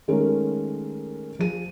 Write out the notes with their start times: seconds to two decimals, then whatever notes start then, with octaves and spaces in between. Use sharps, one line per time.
0.08 D#3 G#3 A3 C#4 G4 A#4
1.39 F3 G#4 D#7